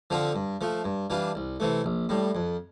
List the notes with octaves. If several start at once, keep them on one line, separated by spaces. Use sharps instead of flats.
D3 F3 C4 F4
G2
F3 A3
G2
E3 G3 D4 F4
C2
C3 E3 A3
A#1
A2 G3
F2